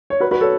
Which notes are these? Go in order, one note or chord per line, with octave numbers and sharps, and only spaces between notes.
C#5
F#4 B4
F#4 B4
A4 C#5